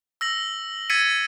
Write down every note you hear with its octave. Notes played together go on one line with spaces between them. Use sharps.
E6 A#6 F#7
E6 G#6 A6 B6 C#7 D#7